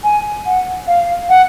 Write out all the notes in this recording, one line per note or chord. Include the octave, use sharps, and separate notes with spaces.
G#5
F#5
F5
F#5